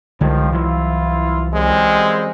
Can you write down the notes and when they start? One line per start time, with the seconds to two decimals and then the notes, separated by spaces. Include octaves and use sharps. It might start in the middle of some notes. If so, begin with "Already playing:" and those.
0.21 C2 D3 D#3 F3 G3 G#3
0.52 E3 F#3 E4 F4
1.54 F#2 G3 G#3 C4